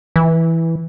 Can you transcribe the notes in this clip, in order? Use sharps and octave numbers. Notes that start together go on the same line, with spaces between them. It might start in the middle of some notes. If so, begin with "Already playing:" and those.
E3